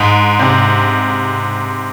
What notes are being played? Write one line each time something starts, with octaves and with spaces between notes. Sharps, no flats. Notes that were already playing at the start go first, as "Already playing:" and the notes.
Already playing: G#2
C3